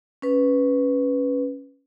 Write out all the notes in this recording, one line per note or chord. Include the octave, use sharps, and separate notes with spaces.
C#4 B4